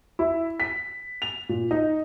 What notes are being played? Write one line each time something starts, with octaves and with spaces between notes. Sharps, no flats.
E4
B6
F7
A#2
D#4